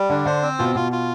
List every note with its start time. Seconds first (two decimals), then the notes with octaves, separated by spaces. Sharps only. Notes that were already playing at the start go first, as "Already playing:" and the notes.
Already playing: G3
0.09 D3 D4
0.26 D3 C5
0.42 C4
0.59 B2 F4
0.75 B2 F4
0.92 F4